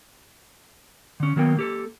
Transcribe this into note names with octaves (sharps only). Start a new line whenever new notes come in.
D3 C#4
D#3 F#3 A#3 B3 G5
A#3 G4 A4